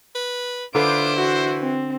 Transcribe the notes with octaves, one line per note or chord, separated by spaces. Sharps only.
B4
D3 E4 F4 B4 C5 D6 D7
E3 F#4
C4